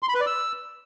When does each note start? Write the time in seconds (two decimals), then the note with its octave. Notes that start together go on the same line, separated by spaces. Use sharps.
0.03 C6
0.09 B5
0.15 B4
0.21 D5
0.27 E6